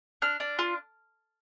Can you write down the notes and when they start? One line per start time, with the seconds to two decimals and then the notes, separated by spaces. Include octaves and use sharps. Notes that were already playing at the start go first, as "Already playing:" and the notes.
0.22 D4 F6
0.40 D4
0.59 F4